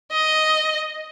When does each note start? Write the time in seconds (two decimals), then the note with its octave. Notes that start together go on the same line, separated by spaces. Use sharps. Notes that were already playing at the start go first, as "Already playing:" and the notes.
0.11 D#5